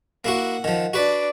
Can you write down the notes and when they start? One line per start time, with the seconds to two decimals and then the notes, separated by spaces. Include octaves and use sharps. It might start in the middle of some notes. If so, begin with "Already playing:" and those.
0.25 A#3 E4 F#4 F#5
0.64 D#3 F3
0.93 D4 F#4 B4 D5